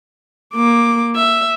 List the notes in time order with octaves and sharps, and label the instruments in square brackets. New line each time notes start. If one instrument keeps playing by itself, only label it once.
[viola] A#3 D6
E5